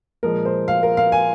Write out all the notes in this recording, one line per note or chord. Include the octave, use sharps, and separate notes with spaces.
A#2 F3 G#3 A#4
C5
F5
A#4
F5
G#5